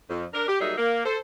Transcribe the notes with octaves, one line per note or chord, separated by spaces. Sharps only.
F2
D4 A#4
G4
F#3 G3 A#3 D#4 G#4 E5
A#3
A4 C5